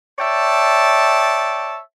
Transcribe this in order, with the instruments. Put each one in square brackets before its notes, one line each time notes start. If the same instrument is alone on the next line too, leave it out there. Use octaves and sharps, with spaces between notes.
[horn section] C#5 D5 E5 G5 A5